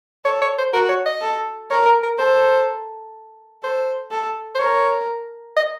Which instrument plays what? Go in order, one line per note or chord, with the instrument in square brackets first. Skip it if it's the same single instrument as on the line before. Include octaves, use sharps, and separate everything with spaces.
[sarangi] A4 [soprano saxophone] C#5
[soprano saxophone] C#5
C5
[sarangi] F#4 [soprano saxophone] A#4
[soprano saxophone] C#5
D#5
[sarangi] A4
[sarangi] A#4 [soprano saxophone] C#5
[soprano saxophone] A#4
A#4
[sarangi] A4 [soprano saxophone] C5
[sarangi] A4 [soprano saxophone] C5
[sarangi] A4
[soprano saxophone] C5
[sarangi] A#4 [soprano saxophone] C#5
[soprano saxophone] D#5